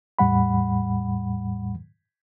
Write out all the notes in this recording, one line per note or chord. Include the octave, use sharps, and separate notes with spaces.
E2 A2 G3 F#5 B5